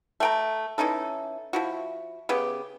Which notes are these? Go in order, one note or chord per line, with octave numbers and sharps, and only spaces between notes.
A3 G5 A#5
E3 C#4 D#4 A4
F3 E4 F#4
C#3 B3 G4